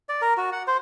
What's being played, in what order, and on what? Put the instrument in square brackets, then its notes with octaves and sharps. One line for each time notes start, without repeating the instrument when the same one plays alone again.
[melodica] D5
A#4
F#4
F#5
C5